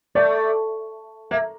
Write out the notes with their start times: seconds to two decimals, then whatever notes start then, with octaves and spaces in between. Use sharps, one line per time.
0.15 A3 D5
1.31 A#3 E5